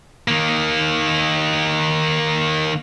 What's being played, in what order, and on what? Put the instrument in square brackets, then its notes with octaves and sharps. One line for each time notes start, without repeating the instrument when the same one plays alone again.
[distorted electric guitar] D#3 A#3